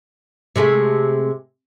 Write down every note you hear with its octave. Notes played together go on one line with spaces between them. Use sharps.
C3 G#3 A3